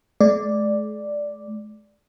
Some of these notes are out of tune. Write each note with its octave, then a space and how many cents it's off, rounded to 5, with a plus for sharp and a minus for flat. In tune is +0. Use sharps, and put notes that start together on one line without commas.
G#3 +45 D5 +0